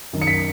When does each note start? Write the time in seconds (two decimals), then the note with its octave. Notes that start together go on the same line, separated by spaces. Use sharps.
0.13 F#2 D#3
0.22 C#7
0.27 B6